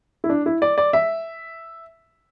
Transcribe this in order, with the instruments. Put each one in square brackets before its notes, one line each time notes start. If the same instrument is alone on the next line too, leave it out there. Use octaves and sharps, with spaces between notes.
[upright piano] E4
D4
E4
D5
D5
E5